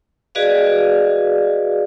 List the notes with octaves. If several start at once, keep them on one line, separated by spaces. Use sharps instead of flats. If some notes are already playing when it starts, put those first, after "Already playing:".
F#4 G#4 B4 D5 D#5 F5